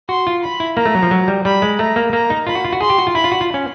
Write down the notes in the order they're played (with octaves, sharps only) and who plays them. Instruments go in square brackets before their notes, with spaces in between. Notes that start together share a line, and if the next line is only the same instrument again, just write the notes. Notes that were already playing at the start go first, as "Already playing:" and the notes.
[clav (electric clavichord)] F#4 [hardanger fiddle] C6
[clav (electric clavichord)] F4
[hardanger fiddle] B5
[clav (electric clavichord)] E4
[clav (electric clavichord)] A#3 [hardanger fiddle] A#5
[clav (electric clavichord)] A3
F#3
F3
F#3
G3
[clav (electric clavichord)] G3 [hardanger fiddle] B5
[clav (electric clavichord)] G#3
[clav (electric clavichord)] A3 [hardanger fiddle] A#5
[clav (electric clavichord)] A#3
[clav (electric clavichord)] A#3 [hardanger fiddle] A#5
[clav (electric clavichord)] D#4
[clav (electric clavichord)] F4 [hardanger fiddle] B5
[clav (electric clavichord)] F#4
F4
F#4
[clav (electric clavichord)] G#4 [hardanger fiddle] C6
[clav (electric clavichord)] G4
F#4
F4
[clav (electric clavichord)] E4 [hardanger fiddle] B5
[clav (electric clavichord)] F4
F#4
F4
C#4